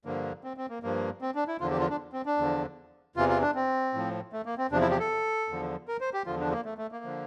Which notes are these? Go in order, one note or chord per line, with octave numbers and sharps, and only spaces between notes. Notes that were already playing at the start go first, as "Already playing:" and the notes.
G2 D3 F3 A#3
C4
C4
A#3
G2 F3 A#3
C4
D4
E4
E2 D3 F3 F4
G4
F4
D4
C4
D4
E2 D3 F3
E2 C3 E3 F4
F4
D4
C4
A2 F3
A3
A#3
C4
E2 C3 F3 D4
E4
G4
A4
E2 D3 F3
A#4
C5
G4
E2 D3 F3 F4
D4
A#3
A3
A3
A#3
D3 F3